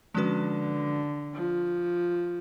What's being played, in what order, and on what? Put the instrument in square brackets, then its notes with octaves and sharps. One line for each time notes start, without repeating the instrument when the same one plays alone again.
[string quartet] D3 [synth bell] F3 G#3 C#4 F#4 B4
[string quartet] F3